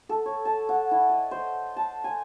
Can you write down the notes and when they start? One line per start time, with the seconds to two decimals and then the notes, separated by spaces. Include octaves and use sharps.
0.09 A4
0.26 C#5
0.45 A5
0.69 F#5
0.91 E4
1.09 D#5
1.31 C5
1.76 A5
2.04 G#5